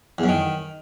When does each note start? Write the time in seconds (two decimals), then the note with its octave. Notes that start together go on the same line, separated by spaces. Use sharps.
0.18 E2
0.24 F#2
0.29 D#3